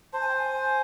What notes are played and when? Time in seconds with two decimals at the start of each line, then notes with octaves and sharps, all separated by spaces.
0.13 C5 A5
0.21 G#5
0.29 G5
0.36 G#5